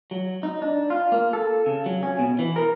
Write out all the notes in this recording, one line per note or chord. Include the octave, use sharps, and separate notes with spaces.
F#3
D#4
D4
F4
A#3
A4
C#3
F#3
C#4
B2
E3
A#4